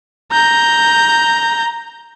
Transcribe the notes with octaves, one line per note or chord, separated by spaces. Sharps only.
A#5 G6